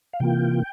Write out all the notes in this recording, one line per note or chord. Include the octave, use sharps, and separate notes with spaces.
F5
C3 E3 A#3 F4 G5